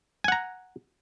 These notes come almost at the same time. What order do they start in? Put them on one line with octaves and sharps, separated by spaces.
G#5 F#5 A#5